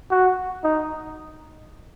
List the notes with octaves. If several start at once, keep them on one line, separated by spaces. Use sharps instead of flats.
F#4
D#4